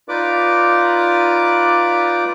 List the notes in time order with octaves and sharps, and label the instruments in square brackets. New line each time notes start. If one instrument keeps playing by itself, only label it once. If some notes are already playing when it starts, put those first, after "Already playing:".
[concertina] D#4 F4 B4 D5 D6